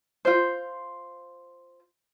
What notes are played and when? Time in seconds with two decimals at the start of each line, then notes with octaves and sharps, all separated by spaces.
0.25 F4 C5